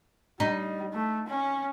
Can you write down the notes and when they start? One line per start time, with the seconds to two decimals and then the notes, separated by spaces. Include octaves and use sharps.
0.40 G3 D#4
0.93 A3
1.27 C#4